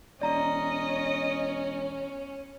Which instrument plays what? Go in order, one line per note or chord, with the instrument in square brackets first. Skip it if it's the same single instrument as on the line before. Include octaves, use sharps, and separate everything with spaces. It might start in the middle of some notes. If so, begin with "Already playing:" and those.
[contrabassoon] E1 [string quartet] C#4 [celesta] D5 A#5 [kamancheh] D#5